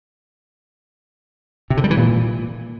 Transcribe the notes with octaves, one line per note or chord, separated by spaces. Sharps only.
C3
D3
G3
E3
A#2